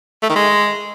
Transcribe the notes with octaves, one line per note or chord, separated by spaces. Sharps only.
A3
D#3
G#3